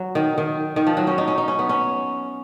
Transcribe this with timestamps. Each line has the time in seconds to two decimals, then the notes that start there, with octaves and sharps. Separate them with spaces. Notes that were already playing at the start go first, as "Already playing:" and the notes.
Already playing: F#3
0.15 D#3
0.38 D#3
0.76 D#3
0.87 F3
0.97 F#3
1.07 C#4
1.18 D#4
1.28 C#4
1.38 D#4
1.48 C#4
1.59 B3
1.69 C#4